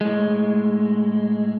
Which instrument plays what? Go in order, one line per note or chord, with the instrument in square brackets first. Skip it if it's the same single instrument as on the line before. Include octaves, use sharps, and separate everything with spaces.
[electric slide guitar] A2 G#3